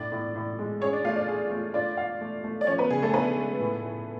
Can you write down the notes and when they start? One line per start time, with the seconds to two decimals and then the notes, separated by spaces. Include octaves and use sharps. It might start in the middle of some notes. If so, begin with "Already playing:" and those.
Already playing: A2 D4 D5
0.12 A2
0.36 A2
0.59 G#3
0.81 C#4 G#4 C#5
0.93 D4 D5
1.04 A3 F4 F5
1.16 D4 D5
1.28 G#4
1.51 A3
1.74 D4 F4 D5
1.97 F5
2.21 A3
2.44 A3
2.61 D5
2.67 F3 C#4 C#5
2.78 B3 B4
2.90 C#3 G#4
3.02 A3 A4
3.14 B3 D4 B4
3.37 G#3
3.60 A2
3.83 A2